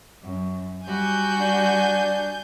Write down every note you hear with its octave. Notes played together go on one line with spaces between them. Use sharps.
F#2
G3 F#4 F#5 G#5 G6
D4